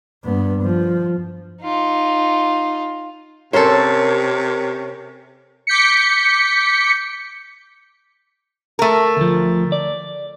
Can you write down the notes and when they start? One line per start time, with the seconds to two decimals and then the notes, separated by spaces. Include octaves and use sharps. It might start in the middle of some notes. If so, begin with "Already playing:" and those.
0.24 G2 B3
0.62 F3
1.62 D#4 F4
3.53 C3 C#4 A4 A#4 C5 C#5
5.67 D6 G6 B6 C#7
8.79 A3 A#4
9.17 D2 F3
9.72 D5